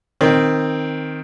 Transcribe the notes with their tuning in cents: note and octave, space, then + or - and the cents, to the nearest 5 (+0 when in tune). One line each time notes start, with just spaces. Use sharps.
D#3 +0 C4 +5